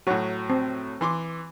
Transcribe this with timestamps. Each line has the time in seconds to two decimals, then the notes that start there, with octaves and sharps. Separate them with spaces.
0.07 A2 F#3 F#4 C#5
0.50 C4
1.01 E3 C6 D6